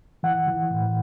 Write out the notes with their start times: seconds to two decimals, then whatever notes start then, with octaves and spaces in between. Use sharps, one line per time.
0.23 E3 F#5
0.48 E3
0.71 A2